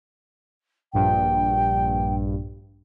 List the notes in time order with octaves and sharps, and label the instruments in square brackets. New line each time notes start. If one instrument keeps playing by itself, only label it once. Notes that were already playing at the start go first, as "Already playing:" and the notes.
[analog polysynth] A#1 G2 [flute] G5